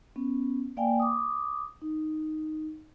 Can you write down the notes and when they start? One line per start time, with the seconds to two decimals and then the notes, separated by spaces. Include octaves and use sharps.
0.16 B3 C#4
0.77 A#3 D5 F5 G5 G#5
1.00 D6 D#6
1.82 D#4